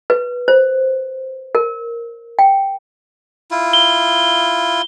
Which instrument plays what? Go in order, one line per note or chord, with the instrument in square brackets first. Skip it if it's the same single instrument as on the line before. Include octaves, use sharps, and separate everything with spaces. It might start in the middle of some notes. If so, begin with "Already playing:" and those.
[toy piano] B4
C5
A#4
G5
[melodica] E4 F4
[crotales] G7